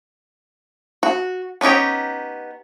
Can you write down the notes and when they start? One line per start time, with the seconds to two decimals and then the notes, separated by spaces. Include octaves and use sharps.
1.03 F#4
1.61 B3 C#4 D#4 G4 C#5